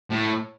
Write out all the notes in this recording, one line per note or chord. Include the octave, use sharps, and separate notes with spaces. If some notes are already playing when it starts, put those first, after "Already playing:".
A2